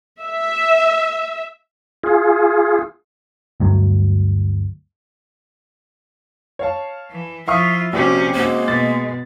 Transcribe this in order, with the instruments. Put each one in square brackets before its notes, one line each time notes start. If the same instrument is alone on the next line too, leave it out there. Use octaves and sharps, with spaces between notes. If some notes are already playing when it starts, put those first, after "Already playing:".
[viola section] E5
[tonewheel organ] F4 G#4
[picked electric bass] D2 G2 F#3
[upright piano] C#5 F5 A5
[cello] E3
[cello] F3 F4 [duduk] E4 [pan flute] E5 [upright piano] F5 C#6 D#6
[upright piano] A#1 [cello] C3 C#4 [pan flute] F#4 [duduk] G4
[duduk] G#3 [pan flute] A#3 [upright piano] C4 F#4
[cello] B2 [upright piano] A6